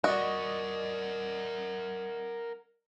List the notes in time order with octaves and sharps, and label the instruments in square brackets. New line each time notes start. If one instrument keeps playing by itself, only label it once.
[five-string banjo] F#4 [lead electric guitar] A#4 F#5 [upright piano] D5 D#5